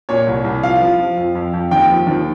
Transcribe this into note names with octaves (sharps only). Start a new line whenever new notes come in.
A#2 C#5
C2
C2
F3 F5
F3
F3
F2
F2
F2
D#2 G5
F3
D#2